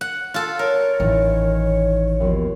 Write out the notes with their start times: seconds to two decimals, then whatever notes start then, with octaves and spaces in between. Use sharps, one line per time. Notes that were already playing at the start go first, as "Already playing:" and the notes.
0.01 F#5
0.34 F4 A4
0.59 A#4 C#5
1.00 A1 D#3 E3
2.20 D#2 B2 F3